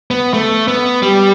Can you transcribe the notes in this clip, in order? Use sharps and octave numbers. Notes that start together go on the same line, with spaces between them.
B3
A3
B3
G3